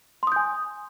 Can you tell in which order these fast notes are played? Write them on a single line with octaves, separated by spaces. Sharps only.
C6 D#6 G6 G#5